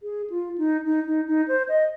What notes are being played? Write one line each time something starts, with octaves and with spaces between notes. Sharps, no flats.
G#4
F4
D#4
D#4
D#4
D#4
C5
D#5